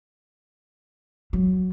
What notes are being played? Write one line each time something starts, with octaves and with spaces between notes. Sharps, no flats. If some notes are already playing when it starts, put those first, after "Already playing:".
F#3